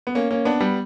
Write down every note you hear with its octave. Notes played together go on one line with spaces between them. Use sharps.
B3
A#3 C#4
A#3 C#4
B3 D4
G3 B3